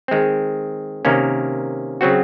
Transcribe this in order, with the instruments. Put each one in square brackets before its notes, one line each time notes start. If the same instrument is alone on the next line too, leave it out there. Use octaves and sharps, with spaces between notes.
[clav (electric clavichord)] D#3 G#3 C4
C3 D#3 A#3 C#4
C#3 F#3 C4 F#4